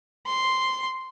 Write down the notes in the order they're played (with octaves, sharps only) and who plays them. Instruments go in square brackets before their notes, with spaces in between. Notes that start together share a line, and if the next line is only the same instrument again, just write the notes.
[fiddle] C6